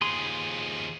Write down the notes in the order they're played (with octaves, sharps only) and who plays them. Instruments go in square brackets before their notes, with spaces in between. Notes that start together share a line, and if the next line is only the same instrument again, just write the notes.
[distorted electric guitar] D#2 F3 [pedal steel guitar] G#4 C6